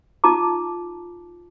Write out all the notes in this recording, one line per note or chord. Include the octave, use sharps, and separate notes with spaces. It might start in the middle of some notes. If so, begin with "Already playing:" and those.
D#4 F4 A5 A#5 D6